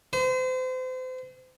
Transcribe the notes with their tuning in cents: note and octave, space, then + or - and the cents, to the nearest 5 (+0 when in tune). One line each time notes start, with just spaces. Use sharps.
C5 -35